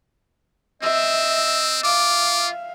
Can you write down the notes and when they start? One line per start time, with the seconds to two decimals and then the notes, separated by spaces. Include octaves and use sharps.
0.82 C4 D#5 E5 E6
1.83 F4 E5 F5 D6